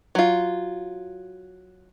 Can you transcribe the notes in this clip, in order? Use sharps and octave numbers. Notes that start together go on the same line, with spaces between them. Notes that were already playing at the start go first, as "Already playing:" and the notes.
F#3 F4